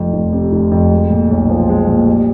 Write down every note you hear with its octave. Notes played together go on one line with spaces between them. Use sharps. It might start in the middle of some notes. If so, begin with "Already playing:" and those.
Already playing: F1 F2
F1
C3
F1
F2
G#3
A#2
B1
F3
G#3
A#2
G3